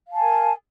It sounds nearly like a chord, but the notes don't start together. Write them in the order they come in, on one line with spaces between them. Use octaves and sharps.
F5 A5 G#5 A#4